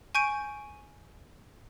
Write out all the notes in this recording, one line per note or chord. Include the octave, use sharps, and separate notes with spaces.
G#5 C#6 G6 D7 D#7